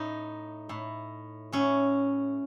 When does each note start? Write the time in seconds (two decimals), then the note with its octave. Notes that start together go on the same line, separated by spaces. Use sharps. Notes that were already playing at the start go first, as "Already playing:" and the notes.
Already playing: A2 D#4
0.69 A2
1.52 A2 C#4